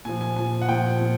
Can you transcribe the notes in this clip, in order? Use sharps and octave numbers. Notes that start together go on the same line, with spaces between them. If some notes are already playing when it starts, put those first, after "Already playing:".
A#2 F3 G#5
G#5
A#2 F3 G#5
F#5
A#2 F3 G5
A#2